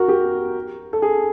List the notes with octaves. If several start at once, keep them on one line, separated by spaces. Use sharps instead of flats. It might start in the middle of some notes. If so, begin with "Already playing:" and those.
Already playing: F#4 A#4
G4
A4
G#4